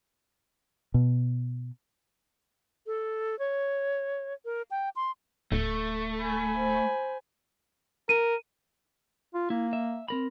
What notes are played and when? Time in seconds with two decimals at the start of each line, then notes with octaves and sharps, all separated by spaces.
0.94 B2
2.87 A4
3.39 C#5
4.45 A#4
4.71 G5
4.96 C6
5.52 D1 A3
6.19 G#5 B5
6.55 C5
8.09 A#4 D#7
9.34 F4
9.50 A#3 E4
9.73 E5
10.08 C4 A#4 B5